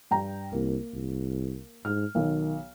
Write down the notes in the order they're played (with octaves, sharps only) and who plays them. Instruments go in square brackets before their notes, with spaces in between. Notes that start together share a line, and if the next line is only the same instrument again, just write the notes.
[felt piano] G2 G5 A#5
[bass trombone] C2 [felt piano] A#3
[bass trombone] C2
[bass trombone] G#2 [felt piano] F6
[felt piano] B1 [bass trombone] D#3